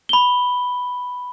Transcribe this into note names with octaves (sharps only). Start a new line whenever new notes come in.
B5 G7